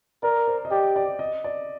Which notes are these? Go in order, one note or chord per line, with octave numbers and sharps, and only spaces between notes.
A#4 D5
C5
D#5
G4 D5
D5
D#5
D5